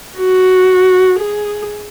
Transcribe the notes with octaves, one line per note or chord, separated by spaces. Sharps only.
F#4
G#4